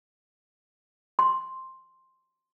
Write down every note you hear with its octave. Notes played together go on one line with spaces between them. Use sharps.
C6